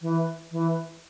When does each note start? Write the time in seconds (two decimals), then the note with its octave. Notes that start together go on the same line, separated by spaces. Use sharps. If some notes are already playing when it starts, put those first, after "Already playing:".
0.02 E3
0.52 E3